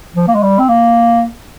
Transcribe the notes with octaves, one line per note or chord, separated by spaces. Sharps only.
F3
A#3
G#3
G3
C4
A#3